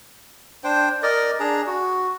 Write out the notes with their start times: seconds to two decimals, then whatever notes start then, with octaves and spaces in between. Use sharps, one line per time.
0.64 D4 C5 G5
1.03 A#4 D5 D#5
1.40 D4 G#4 A#5
1.67 F#4